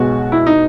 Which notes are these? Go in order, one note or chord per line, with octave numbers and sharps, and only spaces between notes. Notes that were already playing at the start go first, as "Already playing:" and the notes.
Already playing: B1 B2 G#3 F#4
E4
D#4